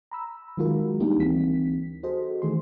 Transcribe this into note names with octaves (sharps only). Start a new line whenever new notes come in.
A#5 B5 E6
D#3 F#3 G#3 F4 F#4 A#4
G3 A#3 D4 D#4 G4
D2 E3 C4 B6
F#4 G#4 A4 C5 D#5
D#3 E3 A3 G#4 C6